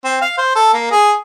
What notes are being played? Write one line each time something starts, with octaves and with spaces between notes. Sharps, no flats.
C4
F5
C5
A4
A#3
G#4